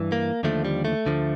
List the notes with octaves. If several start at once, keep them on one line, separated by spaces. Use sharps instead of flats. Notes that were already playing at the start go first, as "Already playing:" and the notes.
Already playing: G2 E3
A#3
D#2 D3 F3 A3
G3
A3
D2 D3 F3